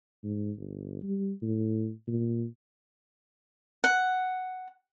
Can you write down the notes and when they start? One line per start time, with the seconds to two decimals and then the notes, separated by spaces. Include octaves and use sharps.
0.24 G#2
0.57 G1
1.02 G3
1.42 A2
2.07 A#2
3.84 F#5